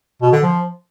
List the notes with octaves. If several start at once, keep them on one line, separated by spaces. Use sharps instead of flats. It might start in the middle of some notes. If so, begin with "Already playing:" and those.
B2
D3
F3